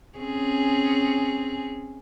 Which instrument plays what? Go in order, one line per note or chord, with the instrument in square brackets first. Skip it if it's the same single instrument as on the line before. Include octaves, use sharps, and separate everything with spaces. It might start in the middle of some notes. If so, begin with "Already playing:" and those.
[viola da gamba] C4 C#4 G#4